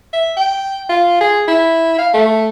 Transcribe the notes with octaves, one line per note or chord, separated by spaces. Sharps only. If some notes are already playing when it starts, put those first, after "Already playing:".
E5
G5
F4
G#4
E4
F5
A3